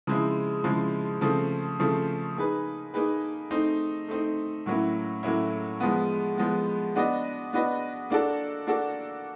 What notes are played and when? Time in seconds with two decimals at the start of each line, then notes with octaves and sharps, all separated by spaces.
0.07 C#3 F3 G#3 C4 E4
0.64 C#3 F3 G#3 C4 E4
1.21 C#3 F3 A3 C4
1.79 C#3 F3 A3 C4
2.37 A#3 D#4 G#4 B4
2.94 A#3 D#4 G#4 B4
3.51 A3 C4 D#4
4.08 A3 C4 D#4
4.66 A2 F#3 A#3 C#4 E4
5.23 A2 F#3 A#3 C#4 E4
5.80 F3 G#3 B3
6.38 F3 G#3 B3
6.96 B3 D4 F#4 B4 D#5
7.53 B3 D4 F#4 B4 D#5
8.10 A#3 D4 F#4 A4
8.67 A#3 D4 F#4 A4